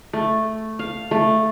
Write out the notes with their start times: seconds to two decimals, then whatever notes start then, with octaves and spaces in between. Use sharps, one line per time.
0.13 A3
0.79 F5
1.11 A3